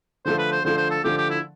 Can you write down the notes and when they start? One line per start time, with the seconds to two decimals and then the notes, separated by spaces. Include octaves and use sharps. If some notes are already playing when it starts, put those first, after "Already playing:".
0.25 D3 F3 A3 C5
0.38 B4
0.52 C5
0.65 D3 F3 A3 C5
0.77 C5
0.91 A4
1.04 D3 F3 A3 G4
1.18 G4
1.30 E4